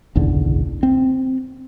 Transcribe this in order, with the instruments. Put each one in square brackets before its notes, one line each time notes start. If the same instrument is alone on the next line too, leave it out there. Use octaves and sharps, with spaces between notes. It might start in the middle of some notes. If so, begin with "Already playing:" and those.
[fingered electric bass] F#1 B1 E2 D3
C4